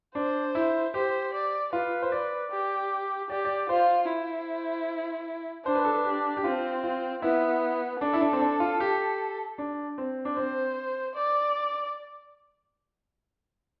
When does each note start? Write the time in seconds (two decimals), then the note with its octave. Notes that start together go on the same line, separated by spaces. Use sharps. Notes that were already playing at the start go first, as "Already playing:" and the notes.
0.15 D4 C5
0.55 E4
0.94 G4 C5
1.33 D5
1.73 F4 B4
2.02 C5
2.12 D5
2.51 G4
3.30 G4 D5
3.45 D5
3.69 F4 C5
4.09 E4
5.66 D4 C5
5.75 B4
5.85 A4
5.94 B4
6.05 G4
6.37 G4
6.44 C4 F4
6.84 F4
7.22 B3 E4
8.01 D4 A4
8.13 E4
8.21 D4
8.33 C4
8.40 D4
8.60 F4
8.80 G4
9.58 D4
9.98 C4
10.25 D4
10.37 C4 C5
11.15 D5